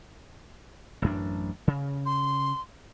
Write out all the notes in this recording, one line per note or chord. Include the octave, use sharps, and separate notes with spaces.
A1 F#2 D4
C#3
C6